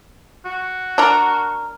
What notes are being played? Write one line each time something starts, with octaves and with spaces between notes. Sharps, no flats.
F#4
D4 A#4